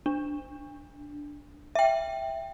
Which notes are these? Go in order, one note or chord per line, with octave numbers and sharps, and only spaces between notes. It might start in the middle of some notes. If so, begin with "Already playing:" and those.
D4
E5 G5